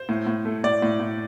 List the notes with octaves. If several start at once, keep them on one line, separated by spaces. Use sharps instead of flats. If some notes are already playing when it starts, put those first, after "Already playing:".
Already playing: C5
A2
A2
A3
A2 D5
A2
A2